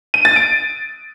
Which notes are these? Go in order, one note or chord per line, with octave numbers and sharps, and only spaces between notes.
D#7
A6
D7